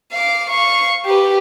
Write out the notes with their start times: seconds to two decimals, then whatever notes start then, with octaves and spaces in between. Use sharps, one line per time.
0.12 F5 D6
0.50 F5 C#6
1.05 G4 B4